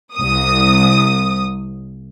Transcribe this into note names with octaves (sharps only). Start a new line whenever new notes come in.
C2 D#6